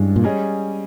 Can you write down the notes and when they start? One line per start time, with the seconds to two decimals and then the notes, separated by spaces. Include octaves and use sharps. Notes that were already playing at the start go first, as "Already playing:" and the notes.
Already playing: G2 E3 G#3 C#4
0.16 A#2
0.24 G3 C#4 G#4 D#5